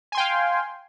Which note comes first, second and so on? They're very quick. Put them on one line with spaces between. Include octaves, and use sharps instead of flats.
G#5 C6 G5 F5